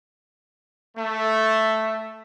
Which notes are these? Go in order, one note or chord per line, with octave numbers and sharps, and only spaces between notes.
A3